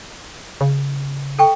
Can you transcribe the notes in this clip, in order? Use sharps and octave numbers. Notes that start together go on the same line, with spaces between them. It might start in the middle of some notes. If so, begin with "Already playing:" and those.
C#3
A4 G5 C#6